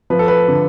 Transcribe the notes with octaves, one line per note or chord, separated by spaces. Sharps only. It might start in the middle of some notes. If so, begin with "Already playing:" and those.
F3 B4
A4
B4
D3